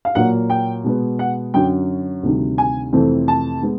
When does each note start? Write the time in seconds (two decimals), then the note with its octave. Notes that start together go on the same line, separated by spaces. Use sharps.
0.05 F5
0.15 A#2 F#3 A#3 F#5
0.50 G5
0.84 B2 G#3 B3
1.19 F#5
1.54 F#2 D3 F#3 G5
2.23 D2 C3 D#3 G3
2.58 G#5
2.93 F2 C3 E3 A3 C4
3.28 A5
3.61 G#3 B3